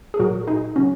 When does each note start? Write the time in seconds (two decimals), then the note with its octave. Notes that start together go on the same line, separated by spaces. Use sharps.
0.14 G#4
0.19 A#2 F#3 F#4 A#4
0.47 D#4 G#4
0.76 C#3 F#3 C#4 F#4